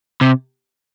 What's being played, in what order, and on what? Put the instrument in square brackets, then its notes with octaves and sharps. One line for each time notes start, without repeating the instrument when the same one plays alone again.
[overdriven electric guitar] C3